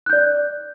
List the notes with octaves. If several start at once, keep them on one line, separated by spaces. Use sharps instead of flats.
D5 F#6 G6